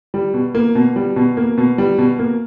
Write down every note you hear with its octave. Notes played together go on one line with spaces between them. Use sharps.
G3
B2
A#3
B2
G3
B2
A#3
B2
G3
B2
A#3